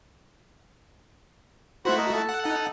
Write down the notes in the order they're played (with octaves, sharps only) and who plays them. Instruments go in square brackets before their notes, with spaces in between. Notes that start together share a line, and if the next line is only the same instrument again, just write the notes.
[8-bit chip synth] A3 E4 F#4 [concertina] C5 F#5 B5
[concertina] A#4 D#5
A4 A5
[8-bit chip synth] F#5
D#4 F#5